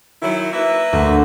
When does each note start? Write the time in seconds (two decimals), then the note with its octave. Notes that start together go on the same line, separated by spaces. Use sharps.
0.22 D#3 F#3 E4
0.53 A#3 B4 E5
0.93 D2